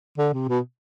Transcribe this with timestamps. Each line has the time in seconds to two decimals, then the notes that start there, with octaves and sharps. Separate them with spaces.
0.18 D3
0.33 C3
0.49 B2